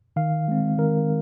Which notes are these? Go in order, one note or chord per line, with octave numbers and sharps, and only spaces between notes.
D#3 F5
G#3 C4
D#3 A#4